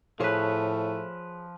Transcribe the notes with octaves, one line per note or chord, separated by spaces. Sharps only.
A2 F3 A3 G#4 B4 C#5